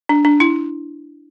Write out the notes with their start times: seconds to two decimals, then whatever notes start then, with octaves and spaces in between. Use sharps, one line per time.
0.09 D4
0.25 D4
0.40 E4